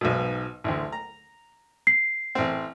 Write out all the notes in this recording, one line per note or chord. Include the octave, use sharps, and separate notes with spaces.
B1 G#2 B2
A1 D2
A#5
C7
A1 C4